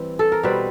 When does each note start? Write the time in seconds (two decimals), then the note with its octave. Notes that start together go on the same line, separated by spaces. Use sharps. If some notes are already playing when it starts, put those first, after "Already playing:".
Already playing: E3 G3 C4
0.19 A4
0.32 A#4
0.43 B2 G3 C4 B4